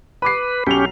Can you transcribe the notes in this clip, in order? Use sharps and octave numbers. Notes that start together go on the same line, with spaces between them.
B4 B5 D6 C7
B1 C#4 G4 F7